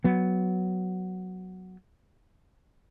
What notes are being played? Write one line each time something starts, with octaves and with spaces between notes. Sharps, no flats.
F#3 B3